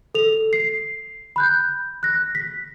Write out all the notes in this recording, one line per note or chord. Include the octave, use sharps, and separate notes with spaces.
A4 F7
C7
B5 F#6 G6
F#6 A#6
B6